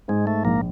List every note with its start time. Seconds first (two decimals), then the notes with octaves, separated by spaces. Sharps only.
0.08 G#2 G#3
0.27 A3
0.44 A#1 A#3